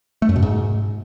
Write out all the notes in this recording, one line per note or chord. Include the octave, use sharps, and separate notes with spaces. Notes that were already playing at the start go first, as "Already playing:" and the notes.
A3
F#2
B2
G#2